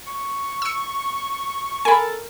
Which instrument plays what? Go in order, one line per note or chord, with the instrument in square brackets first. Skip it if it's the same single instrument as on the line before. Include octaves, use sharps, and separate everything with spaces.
[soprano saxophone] C#6
[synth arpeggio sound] E6 C#7
[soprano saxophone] A4 [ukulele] A#4 [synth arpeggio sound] G#5 B5